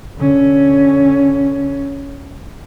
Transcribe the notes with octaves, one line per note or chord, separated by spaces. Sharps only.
D3 C#4